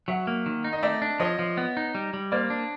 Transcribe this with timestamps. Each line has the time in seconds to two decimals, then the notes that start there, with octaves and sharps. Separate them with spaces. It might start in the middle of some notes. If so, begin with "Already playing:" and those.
0.08 F#3 E5 F#5
0.27 A#3
0.46 D#3
0.64 D#4
0.73 D#5
0.83 A3 D5 E5
1.02 D4
1.20 F3 C#5 D#5
1.39 F3
1.57 B3
1.77 D#4
1.95 G3
2.14 G3
2.32 A#3 C5 D5
2.50 D4